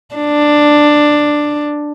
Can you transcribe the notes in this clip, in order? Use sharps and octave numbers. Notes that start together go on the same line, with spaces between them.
D4